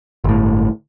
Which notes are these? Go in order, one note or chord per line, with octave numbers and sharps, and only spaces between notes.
G1 A2